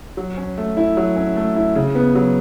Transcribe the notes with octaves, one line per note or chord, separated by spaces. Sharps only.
F#3
C#4
A3
E4
F#3
C#4
A3
E4
C#3
B3
F#3